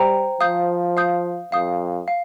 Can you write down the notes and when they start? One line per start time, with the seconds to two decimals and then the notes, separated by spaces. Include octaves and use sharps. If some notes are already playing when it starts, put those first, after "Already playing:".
Already playing: G3 C5 G5 A#5
0.41 F3 F5 D#6 G6
0.97 F5 D#6 G6
1.52 F2 F5 D#6 G6
2.08 F5